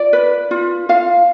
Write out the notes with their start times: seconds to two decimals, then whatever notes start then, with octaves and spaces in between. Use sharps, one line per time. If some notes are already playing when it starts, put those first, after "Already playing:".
Already playing: F4 D5
0.13 B4
0.51 F4
0.89 F4 F5